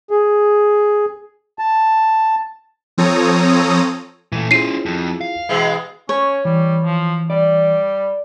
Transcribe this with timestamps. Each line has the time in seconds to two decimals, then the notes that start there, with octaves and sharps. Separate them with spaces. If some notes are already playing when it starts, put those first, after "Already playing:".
0.11 G#4
1.59 A5
2.98 F3 C4 A4 C#5 A#5 D#6
4.32 A#2 E3 A3
4.51 C#4 E4 F4 G#4 C5 C7 D#7
4.86 F2
5.21 F5
5.49 B2 E3 G#3
6.09 C#4 C#5
6.45 E3 G3
6.84 F3
7.30 G3 D5